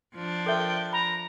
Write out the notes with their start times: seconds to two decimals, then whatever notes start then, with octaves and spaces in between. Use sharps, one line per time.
0.15 F3 D4
0.46 A4 A#4 E5 G5
0.93 A#5 B5